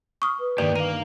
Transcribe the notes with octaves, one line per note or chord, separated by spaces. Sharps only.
C#6 D#6 F6
B4
G2 D#3 A#3 G4 D5
A#4 F5 D#7